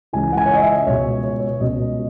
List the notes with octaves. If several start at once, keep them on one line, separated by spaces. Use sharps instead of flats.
C#2 C#3 E3 G#5
F#5
G#5
C#5
D#5
E5
C#2 B2 C#5
C#5
C#5
C#2 B2 D#5